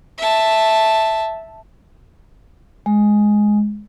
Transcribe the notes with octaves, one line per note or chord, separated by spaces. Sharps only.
E5 A5
G#3